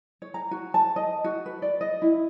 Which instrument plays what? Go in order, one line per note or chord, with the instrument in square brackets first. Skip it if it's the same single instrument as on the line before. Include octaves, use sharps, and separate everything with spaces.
[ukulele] C#5
A#5
F#4
A5
D#5
F#4
B4
D5
D#5
E4